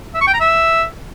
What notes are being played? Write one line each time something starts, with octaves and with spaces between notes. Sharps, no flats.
E5
C#6
G5
A#5
E5